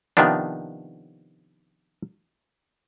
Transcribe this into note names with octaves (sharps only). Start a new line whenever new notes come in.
C3 D#3 F3 B3 D4